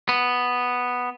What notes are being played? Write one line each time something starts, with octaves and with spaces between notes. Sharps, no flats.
B3